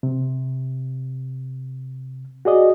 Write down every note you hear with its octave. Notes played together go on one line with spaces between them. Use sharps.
C3
F#4 G#4 D5 D#5